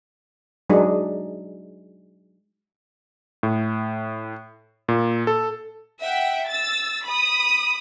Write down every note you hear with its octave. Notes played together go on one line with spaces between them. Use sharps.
F#3 G#3 D4 D#4 G#4
A2
A#2
A4
E5 F#5 G5
E6 A6
B5 D#6